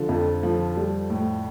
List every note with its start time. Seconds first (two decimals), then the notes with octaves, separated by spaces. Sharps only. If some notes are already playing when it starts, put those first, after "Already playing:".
Already playing: D3 F3 A4
0.09 F2
0.43 F3
0.77 G3
1.10 A2